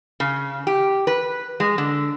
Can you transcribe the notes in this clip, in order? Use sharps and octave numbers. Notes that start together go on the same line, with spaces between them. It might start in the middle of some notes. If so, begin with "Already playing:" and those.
C#3
G4
B4
G#3
D3